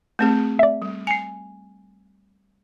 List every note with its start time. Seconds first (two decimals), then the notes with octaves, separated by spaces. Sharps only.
0.19 A3 C4 G#4
0.59 D5 E5
0.82 G3
1.07 G#5 C7 C#7